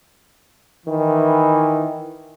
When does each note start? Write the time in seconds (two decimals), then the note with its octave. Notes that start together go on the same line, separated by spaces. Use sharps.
0.86 D#3 E3